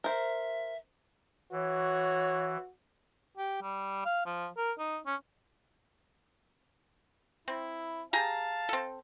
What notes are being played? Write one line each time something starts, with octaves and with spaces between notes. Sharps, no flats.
A#4 C5 E5
E3 F#4 C#5
G4
G3
F5
F3
A#4
D#4
C#4
C4 E4
G4 G#4 F5 A5 A#5
C4 A4